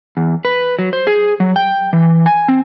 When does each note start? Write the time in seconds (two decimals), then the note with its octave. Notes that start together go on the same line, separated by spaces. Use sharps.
0.17 E2
0.45 B4
0.79 F#3
0.93 C5
1.07 G#4
1.40 F#3
1.56 G5
1.93 E3
2.26 G#5
2.48 C4